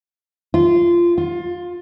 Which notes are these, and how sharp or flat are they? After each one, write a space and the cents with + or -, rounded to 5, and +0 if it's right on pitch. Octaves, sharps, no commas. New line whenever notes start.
F4 -15
F4 +20